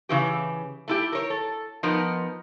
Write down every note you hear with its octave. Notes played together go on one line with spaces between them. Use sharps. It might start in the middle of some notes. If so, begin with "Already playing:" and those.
C#3 E3 G4
A3 E4 G4
A#4 C#5
A4
F3 B3 D#4 A#4